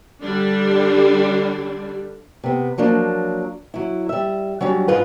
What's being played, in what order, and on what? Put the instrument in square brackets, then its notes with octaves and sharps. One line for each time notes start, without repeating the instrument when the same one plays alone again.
[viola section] D3 G3 D4
[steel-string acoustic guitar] C3 B3
F3 F#3 A#3 D4
F#3 E4
G3 E5
F#3 G3 C#4 D4
G#2 G#3 C#4 F4 B4